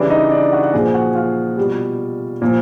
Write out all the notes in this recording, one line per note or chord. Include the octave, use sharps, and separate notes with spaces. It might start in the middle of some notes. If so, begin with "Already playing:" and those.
Already playing: C#3 E3 G3 D4 D5
D#4 D#5
D4 D5
F#4 F#5
F#4 F#5
A#2 F3 G#4 G#5
F#4 F#5
F4 F5
B2 G3
A#2 F3